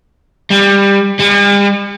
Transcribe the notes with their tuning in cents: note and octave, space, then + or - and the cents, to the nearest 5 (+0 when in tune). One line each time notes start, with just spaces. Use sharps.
G3 +20
G3 +45